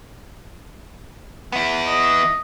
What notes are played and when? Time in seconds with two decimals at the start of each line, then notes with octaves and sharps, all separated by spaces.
1.52 B3 E4
1.87 D#5